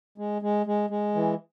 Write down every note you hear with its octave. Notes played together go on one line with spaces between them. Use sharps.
G#3
G#3
G#3
G#3
E3